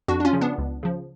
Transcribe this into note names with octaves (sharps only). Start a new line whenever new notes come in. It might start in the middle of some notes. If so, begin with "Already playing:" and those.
F2 D4 F#4
D4
C#4 F4
C#3 F3
B3 D4
C#2
C#3 F3